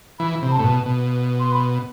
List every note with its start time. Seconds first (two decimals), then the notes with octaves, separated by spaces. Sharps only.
0.19 E3 B5
0.42 C3
0.48 B5
0.52 A5
0.59 A2
0.64 B2
0.86 B2
1.39 C6
1.52 B5